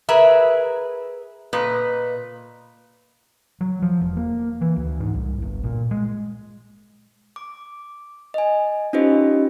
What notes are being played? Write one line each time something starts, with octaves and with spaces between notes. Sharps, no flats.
G#4 A#4 B4 E5
A#2 B4 D#5
F#3
F3
E1
A#3
E3
D2
G#2
C2
G1
A#2
G#3
D6
D#5 G#5
C#4 D#4 F4 G4 C5 D#5